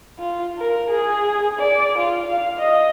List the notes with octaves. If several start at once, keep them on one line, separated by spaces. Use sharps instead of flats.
F4
A#4
G#4
D5
F4
F5
D#5